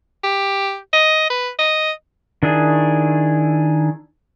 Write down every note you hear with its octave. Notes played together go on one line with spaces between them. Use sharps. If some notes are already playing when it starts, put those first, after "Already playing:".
G4
D#5
B4
D#5
D#3 D4 E4 G#4